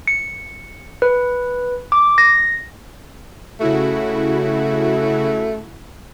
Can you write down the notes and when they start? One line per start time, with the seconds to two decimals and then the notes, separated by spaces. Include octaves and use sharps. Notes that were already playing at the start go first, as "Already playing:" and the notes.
0.07 C#7
1.02 B4
1.92 D6
2.18 A#6
3.60 C#3 A3 E4 F#4